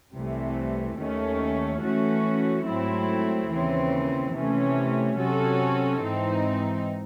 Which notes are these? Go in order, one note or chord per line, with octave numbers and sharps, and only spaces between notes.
C2 C3 E3 A3
D#2 D#3 A3 C#4
E3 A3 C#4 F#4
G#2 F#3 A3 C4 E4
D#2 C#3 E3 C4
C3 E3 A3 C#4
C3 F#3 C#4 F#4 A4
G#2 E3 C4 D#4